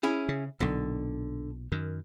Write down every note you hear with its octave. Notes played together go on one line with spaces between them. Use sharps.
C#4 E4 G#4
C#3
B1 A#2 D3
F#2 D#3